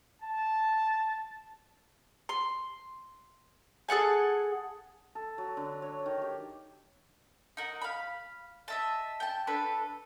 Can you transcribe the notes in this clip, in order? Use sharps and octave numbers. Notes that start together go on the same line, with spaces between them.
A5
C6
G#4 A4 F#5 G#5
A4
F#3
D3
C#5
D#3
G4
D#4 A#4 F#5
F5 B5
D#5 E5 A5
G5 A5
D4 A4 B4